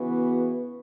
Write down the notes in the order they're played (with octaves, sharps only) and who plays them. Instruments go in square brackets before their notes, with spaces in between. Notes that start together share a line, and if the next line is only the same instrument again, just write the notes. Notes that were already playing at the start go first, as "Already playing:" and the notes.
Already playing: [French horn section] C#3 E3 B3 F#4 B4